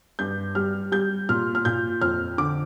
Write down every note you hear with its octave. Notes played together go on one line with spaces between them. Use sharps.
G2 G6
G3 F6
G3 G6
A#2 F6
F6
A#2 G6
F2 F6
D3 D6